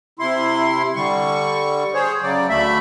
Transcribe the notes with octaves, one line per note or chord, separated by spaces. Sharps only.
C3 E4 C6
D3 G3 C#6
G#4 C5 C#5
C#3 F#3 D5
D2 A3 E5 B5